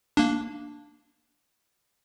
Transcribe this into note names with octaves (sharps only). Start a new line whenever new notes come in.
A#3 D4